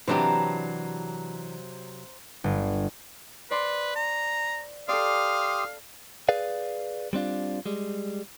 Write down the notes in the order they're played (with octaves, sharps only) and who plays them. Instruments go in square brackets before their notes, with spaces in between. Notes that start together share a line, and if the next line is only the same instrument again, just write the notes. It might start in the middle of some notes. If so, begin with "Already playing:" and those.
[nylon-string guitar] C3 F#3 [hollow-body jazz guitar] E3 D4 G4 [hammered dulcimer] C5 A#5
[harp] G1
[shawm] B4 [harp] C5 D5 C6
[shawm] A#5
[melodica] G4 C6 D#6 [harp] A4 D5 [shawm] F5
[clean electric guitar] G#4 B4 D5 F5
G3 C4 D4 F4
G3 G#3